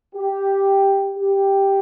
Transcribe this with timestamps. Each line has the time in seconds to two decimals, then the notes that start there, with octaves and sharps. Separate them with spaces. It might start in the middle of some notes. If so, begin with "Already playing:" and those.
0.15 G4
1.17 G4